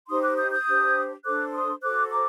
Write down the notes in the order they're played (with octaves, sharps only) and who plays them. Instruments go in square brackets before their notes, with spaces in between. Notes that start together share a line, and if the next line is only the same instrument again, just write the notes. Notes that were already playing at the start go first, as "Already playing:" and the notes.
[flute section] D#4 G4 C5 C6 D#6
D6 F#6
D#6 G6
D#6 G6
D4 G4 C5
D4 A4 C5 D6 F#6
C6 D#6
F#4 A4 C5 D6 F#6
A#5 D6